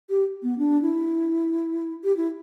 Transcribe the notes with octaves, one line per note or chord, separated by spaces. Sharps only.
G4
B3
D4
E4
G4
E4